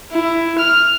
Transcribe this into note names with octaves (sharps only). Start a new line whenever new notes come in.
E4
F6